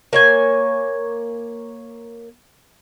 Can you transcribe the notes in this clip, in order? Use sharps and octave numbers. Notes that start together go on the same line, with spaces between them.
A#3 C#5 G#5